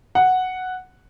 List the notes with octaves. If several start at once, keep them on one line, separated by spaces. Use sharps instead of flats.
F#5